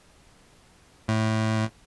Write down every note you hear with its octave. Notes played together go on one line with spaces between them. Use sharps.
A2